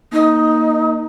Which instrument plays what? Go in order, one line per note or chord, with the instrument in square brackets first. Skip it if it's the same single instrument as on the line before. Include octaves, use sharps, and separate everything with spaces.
[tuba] A#3 [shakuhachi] D#4